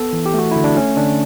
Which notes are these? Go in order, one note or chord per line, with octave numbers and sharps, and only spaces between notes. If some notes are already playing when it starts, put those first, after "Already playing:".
Already playing: B3 A4
E3
G4
A3 F#4
D3 E4
D4
A3 C#4
D3 D4